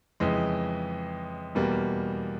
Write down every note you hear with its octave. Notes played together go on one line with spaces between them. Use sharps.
F2 C#3 E3 G#3
E2 B2 G3 A#3